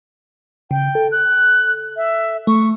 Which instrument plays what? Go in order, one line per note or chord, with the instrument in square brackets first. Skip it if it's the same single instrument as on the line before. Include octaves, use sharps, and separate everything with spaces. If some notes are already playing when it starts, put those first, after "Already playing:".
[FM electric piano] C#3 [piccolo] G5
[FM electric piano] A4
[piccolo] F#6
E5
[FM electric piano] A3 [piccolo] C#6